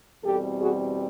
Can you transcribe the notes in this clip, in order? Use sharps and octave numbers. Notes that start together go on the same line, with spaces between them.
E2 B2 G3 C4 G4 A4
F#4 G#4